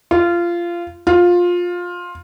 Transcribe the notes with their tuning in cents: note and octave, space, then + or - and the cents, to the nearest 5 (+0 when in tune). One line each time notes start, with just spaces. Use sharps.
F4 -20
F4 +15